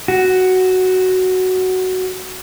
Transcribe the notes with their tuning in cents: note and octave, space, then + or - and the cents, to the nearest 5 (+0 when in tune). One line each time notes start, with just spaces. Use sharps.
F#4 +5